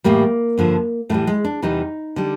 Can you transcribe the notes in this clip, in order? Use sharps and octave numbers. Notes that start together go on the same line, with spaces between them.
A2 E3 G3 A#3
G2 D3 F3
A2 E3 G3 A3
G#3
D4
E2 C3 E3 G3 D#4
D3 G3